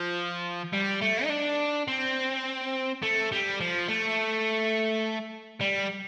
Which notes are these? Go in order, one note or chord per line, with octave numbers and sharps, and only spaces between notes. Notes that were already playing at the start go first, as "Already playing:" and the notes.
Already playing: F3
G3
A3
D#4
D4
C4
A3
G3
F3
A3
G3